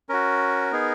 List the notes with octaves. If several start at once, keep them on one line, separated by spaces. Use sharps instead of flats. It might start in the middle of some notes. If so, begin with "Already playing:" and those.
C#4 F#4 A#4
B3 D#4 G#4